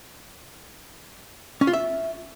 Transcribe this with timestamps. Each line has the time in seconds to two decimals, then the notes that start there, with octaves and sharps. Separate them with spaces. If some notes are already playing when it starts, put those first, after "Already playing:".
1.61 C#4
1.67 F4
1.73 E5